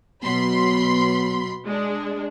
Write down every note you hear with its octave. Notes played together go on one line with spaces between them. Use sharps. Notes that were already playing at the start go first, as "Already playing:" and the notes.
B2 F#3 B3 B5 C6
G#3 D4